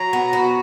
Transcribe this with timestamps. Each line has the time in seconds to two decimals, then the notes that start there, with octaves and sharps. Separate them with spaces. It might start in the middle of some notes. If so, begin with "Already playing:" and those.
Already playing: F#3 A#5
0.13 B3
0.33 F#4